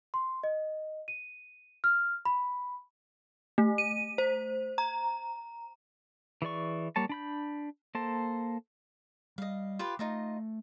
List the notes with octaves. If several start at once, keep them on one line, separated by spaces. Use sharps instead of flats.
C6
D#5
D#7
F6
B5
A3
D#7
C5
A#5
E3 G#4 D5 C#6
G3 A#3 C#5 A5
D4 B5 G6
A#3 A4 C5 A5
G3 D#5 F5
F4 G4 B4
A3 D#4 F4 D#5